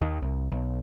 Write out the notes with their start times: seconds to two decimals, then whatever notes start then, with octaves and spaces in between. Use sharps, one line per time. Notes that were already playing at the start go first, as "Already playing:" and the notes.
0.01 D#2 D#3
0.22 C2
0.52 B1